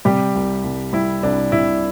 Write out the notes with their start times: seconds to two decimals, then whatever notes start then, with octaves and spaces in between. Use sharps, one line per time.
0.05 C3 G3 G4
0.35 C2
0.64 C2
0.93 G3 E4
1.22 C2 D4
1.52 C3 E4